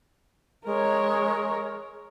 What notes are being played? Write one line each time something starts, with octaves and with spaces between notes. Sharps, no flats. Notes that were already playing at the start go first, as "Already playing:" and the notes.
G#3 A#4 C#5